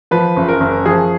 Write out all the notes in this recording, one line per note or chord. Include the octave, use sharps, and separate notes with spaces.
F3 B4
F#1
A#4
F#1
F3 G#4